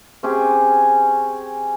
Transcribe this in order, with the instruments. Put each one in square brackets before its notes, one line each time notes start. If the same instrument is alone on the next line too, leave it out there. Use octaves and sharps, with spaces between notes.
[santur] C4 C#4 G4 G#4